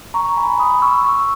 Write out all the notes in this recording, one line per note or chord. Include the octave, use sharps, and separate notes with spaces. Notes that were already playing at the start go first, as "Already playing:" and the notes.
A#5 C#6
G#5 B5
B5 D#6
C#6 E6
C#6 E6